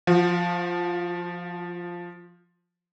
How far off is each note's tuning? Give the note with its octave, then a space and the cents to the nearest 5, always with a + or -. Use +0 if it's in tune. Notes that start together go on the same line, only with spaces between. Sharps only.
F3 +0 F#4 -40